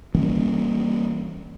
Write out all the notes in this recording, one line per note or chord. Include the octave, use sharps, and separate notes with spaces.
E3 G3 A#3 C#4